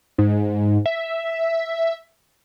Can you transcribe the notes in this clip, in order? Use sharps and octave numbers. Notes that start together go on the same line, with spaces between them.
G#2
E5